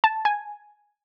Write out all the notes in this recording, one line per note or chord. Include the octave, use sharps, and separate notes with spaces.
A5
G#5